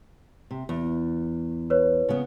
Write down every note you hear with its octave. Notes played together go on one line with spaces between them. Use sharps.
C3
E2
B4 C#5
C#3 B3